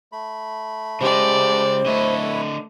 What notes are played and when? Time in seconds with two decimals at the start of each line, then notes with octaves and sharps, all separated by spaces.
0.12 A3 B5
1.01 C#3 G#3 G4 C5 D5
1.86 D3 A3 E4 B4 C#5 D#5